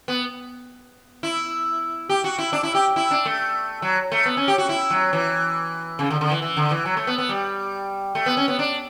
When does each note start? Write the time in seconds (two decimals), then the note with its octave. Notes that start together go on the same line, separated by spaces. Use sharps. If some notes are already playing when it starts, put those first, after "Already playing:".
0.08 B3
1.23 E4
2.09 G4
2.24 F#4
2.38 E4
2.53 D4
2.63 E4
2.74 G4
2.96 E4
3.11 D4
3.25 A3
3.82 F#3
4.12 A3
4.26 B3
4.37 C#4
4.48 G4
4.58 F#4
4.69 E4
4.90 F#3
5.13 E3
5.99 C#3
6.10 D3
6.21 D3
6.31 E3
6.42 E3
6.57 D3
6.71 E3
6.85 F#3
6.97 A3
7.07 B3
7.18 B3
7.29 G3
8.15 A3
8.26 B3
8.37 C#4
8.48 B3
8.59 D4